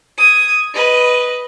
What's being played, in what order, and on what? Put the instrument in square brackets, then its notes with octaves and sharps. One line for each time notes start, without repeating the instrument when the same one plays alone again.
[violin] D#6 G#6
B4 D#5